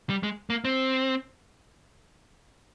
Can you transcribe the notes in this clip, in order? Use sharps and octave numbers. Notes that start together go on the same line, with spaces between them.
G3
G#3
A#3
C4